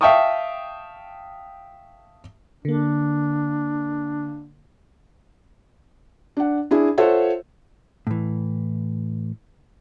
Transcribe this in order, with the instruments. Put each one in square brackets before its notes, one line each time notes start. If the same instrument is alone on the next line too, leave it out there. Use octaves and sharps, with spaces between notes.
[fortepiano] E5 F5 G5 A5 C#6 D#6
[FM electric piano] D3 A#3 [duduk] D4
[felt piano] D4 F#5
D4 E4 G#4
F4 A4 C5 C#5 E5 F#5
[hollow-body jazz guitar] A2 E3